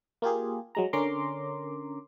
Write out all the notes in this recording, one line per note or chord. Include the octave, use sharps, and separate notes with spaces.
A#3 F4 G4 G#4
F#3 G#3 A#5
D3 C#4 A#4 A#5 C6 D6